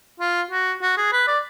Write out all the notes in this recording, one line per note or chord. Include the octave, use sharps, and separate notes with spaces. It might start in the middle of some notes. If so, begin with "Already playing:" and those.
F4
F#4
F#4
G#4
B4
D5